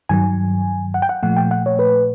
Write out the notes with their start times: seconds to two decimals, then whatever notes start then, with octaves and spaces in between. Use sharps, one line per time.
0.09 G2 D#3 F#3 G#5
0.94 F#5
1.02 G5
1.09 F#5
1.23 A#2 F3 A3 F#5
1.37 G5
1.51 F#5
1.66 C#5
1.79 B4